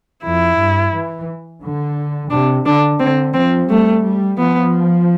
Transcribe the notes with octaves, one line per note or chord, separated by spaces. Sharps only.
F2 E4
G2
E3
D3
C3 D4
D3 D4
D3 C4
F3 C4
G3 A3
G3
F3 B3